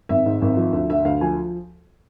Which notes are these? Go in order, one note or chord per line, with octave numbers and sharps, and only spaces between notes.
G#1 E5
G#2
G#1
F3
D2
D3 E5
D2 F5
F3 G#5